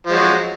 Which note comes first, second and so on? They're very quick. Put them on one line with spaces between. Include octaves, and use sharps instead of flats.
F3 G#3 F#3